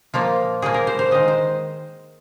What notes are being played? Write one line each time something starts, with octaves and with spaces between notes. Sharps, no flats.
A#2 F3 A#3 F4
A#2 F3 A#3 G#4
A#4
C5
C5
D#3 G#3 D#5
C5